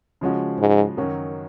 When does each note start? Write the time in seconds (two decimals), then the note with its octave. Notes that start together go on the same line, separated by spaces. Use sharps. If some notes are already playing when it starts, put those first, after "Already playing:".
0.21 C#3 F3 G#3 C#4 F#4
0.59 G#2
0.97 F#2 D#3 F#3 C#4 F#4